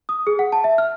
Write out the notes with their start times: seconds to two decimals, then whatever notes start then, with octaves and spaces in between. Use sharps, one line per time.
0.09 D#6
0.27 G#4
0.39 F#5
0.52 A5
0.64 E5
0.78 F6